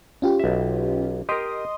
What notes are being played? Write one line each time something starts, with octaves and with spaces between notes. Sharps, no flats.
C#4 F4 G4
B1 E5
G4 A#4 D#5 C6 D#6